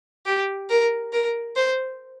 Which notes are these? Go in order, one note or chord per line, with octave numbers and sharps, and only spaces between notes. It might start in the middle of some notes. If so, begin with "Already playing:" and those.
G4
A#4
A#4
C5